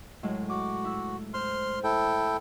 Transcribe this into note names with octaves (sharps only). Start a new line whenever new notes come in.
A2 F#3 G#3
F#4 D6
E4 E6
C5 C6 F6
E4 A4 G5